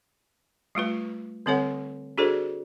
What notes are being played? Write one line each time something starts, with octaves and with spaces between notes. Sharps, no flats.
G3 A3 F4 B4
D3 G3 C4 A4 C#5 F#5
D4 F#4 G#4 A4 C5 D5